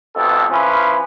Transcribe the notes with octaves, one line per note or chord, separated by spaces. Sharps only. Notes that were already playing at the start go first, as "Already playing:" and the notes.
A1 F2 B2 A4
F3 C#4 E4 B4